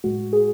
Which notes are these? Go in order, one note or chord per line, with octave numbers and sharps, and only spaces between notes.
A2 G#3 F#4
G#4